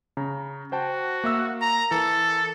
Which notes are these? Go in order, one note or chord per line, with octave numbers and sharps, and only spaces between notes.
C#3 A#5
F#4 C5 G5 A5
A#3 E5 E6
A#5
E3 A4 A#4